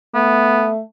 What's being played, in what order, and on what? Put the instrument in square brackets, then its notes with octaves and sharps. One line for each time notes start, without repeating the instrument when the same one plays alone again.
[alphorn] A3 [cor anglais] B3